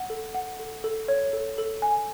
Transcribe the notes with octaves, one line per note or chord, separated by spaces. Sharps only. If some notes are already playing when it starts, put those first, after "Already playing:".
Already playing: F#5
A4
F#5
A4
A4
C#5
A4
A4
G#5